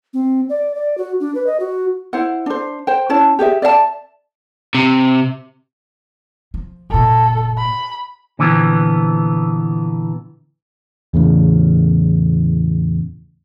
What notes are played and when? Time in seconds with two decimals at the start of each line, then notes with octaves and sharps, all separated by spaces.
0.14 C4
0.49 D5
0.75 D5
0.98 F#4
1.20 D4
1.35 B4
1.47 D#5
1.60 F#4
2.13 E4 C5 F#5
2.46 D4 C5
2.87 C5 G5
3.09 C#4 E4 C#5 A5
3.39 G4 G#4 C#5 E5
3.62 D5 E5 F5 A5
4.75 C3
6.54 F3
6.90 F#1 A#2 A4
7.58 B5
8.39 A#2 D3 E3 F3 B3
11.14 E2 A2 C#3